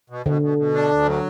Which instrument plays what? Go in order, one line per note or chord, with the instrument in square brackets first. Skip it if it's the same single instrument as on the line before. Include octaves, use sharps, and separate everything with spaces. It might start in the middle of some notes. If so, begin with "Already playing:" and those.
[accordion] B2
[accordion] B2 [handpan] D3
[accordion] B2
B2
D4
D2
F#3